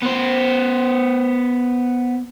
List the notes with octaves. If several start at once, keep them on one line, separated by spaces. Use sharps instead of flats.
B3 C5